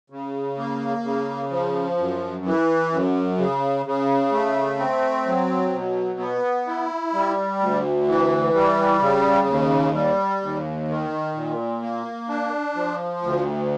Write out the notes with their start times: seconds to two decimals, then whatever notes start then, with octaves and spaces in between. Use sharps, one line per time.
0.10 C#3
0.58 A#3
1.03 C#3
1.51 F3
1.98 F#2
2.45 E3
2.92 F#2
3.38 C#3
3.86 C#3
4.32 A3
4.79 C4
5.26 F#3
5.72 B2
6.19 B3
6.66 E4
7.13 G3
7.60 D2
8.07 E3
8.54 G3
9.01 C#3
9.47 D#2
9.94 G3
10.42 D#2
10.89 D#3
11.35 A#2
11.82 A#3
12.28 D4
12.75 F3
13.22 D2